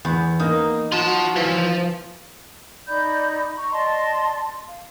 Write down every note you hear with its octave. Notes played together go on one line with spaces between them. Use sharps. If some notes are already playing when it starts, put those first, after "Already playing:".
E2
A#3 D#4
F4 F#4 A5
E3 F3
D#4 D5 B5 G6
A#5 C#6
D5 D#5 A5 C6
F5